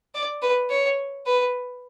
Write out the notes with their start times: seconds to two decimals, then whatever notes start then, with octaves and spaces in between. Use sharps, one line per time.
0.14 D5
0.42 B4
0.70 C#5
1.26 B4